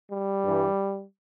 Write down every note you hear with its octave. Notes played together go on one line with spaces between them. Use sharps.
G3
G2 E3